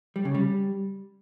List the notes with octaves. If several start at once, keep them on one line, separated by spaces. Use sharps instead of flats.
G3
C#3
G3